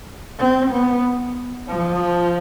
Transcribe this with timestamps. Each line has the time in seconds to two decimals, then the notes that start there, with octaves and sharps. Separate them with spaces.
0.39 C4
0.72 B3
1.69 F3